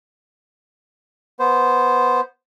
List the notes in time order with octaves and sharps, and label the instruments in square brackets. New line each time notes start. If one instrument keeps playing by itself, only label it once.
[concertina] B3 C5